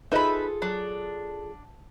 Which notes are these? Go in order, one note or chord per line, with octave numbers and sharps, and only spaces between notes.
D#4 F4 G#4 A4 B4 D#5 E5 B5
F#3 D4